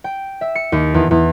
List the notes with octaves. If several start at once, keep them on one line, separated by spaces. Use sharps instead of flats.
G5
E5
C#7
D#2
E2
E2